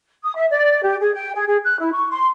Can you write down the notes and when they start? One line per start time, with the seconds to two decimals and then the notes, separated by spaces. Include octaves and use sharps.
0.23 D#6
0.35 E5
0.51 D5
0.83 G4
1.01 G#4
1.14 G5
1.34 G#4
1.46 G#4
1.64 F#6
1.80 E4
1.93 C#6
2.10 C6